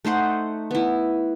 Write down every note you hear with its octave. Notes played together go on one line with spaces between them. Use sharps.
A3 D#4 C5 F#5
B3 E4